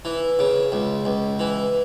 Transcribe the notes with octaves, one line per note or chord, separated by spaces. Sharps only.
E3
C#3
C#2
C#2
E3